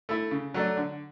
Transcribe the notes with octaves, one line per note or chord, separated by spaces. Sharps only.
A3 E4
C#3
F#3 A3 D4
D3